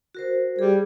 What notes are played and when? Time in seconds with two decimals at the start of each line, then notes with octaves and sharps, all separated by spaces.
0.15 F#4 A#4 C5
0.59 G3 G#4